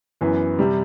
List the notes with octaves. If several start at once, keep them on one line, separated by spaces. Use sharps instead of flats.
F#2 E3 B3
C3 G3